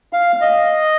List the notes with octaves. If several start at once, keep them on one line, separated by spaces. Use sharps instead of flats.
F5
D#5